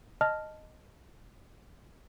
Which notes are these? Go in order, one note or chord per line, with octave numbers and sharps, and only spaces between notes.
D#5 A5 F6